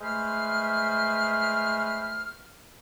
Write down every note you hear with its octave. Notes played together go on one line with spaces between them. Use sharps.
G#3 A3 B4 C5 F6